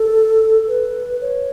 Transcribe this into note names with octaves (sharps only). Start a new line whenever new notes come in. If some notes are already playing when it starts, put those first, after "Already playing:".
Already playing: A4
B4
C#5